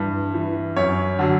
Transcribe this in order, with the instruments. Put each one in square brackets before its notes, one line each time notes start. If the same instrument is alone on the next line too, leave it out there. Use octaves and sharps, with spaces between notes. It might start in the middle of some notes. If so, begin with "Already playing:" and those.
Already playing: [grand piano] G2 E3
E3
F#2 C#5
D3 F#3